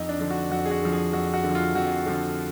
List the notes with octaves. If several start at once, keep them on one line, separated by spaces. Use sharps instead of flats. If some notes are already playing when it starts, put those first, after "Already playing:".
Already playing: F2 D#4
D4
D3 F3
F#4
F2 F#4
G#4
F#4
D3 F3
G#4
F2 F#4
F#4
D3
F3
F4
F2 F#4
D3 F3